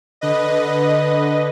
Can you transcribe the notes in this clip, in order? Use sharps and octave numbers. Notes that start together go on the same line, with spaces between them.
D3 B4 D#5